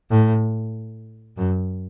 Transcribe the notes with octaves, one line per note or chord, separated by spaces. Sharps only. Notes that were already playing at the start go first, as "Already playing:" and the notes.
A2
F#2